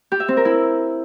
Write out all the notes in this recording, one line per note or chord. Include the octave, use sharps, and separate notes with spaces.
G4
E5
C4
A#4
E4